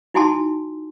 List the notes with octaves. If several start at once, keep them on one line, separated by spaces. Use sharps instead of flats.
D#4 E4 F#4 G#5 A5 C6